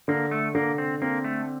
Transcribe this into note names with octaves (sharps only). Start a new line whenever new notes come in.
D3 A#3
A3
D3 A#3
C4
A#3 C4
A3